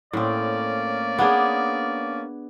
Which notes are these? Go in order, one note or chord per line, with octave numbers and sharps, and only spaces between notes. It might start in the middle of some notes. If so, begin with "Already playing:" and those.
A2 A#3 C4 C#4 D5
B3 D4 G#4